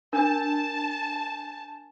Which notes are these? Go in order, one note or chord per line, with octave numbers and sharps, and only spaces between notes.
D4 A#4 G#5 A5 G6